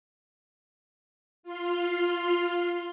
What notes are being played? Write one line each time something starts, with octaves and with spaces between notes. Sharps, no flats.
F4 C6 F6